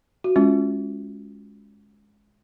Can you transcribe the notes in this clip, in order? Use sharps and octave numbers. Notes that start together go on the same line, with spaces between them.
F#4
G#3 C#4 F4